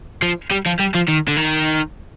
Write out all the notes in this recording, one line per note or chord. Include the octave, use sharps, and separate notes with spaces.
F3
G3
F3
G3
F3
D#3
D3
D#3